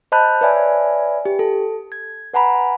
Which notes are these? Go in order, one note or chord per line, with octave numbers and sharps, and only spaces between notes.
C5 D#5 A5 B5 F#6 G6
B4 C#5 D5 E5 G#5 B5
G4
A4
G#6
B4 F#5 G#5 A#5 B5